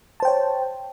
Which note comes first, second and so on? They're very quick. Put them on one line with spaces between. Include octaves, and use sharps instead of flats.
A5 C5 G5 C#5